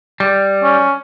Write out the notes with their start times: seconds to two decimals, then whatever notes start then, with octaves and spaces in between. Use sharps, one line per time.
0.20 G3
0.63 C#4